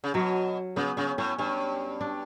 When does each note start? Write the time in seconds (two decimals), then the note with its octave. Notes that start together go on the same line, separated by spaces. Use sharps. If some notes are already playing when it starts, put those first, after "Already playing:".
0.04 C#3
0.14 B2 F#3
0.76 C#3 B3
0.97 C#3 C#4
1.18 A2 C#4
1.38 G2 C#4
2.01 D4